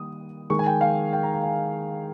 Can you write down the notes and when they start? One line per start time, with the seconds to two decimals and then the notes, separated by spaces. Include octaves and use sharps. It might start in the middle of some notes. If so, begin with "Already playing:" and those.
Already playing: D#3 G3 A#3 D#6
0.50 D#3 G#3 C#6
0.59 G#5
0.66 G5
0.81 F5
1.13 G5
1.23 A#5
1.33 A#5
1.44 G#5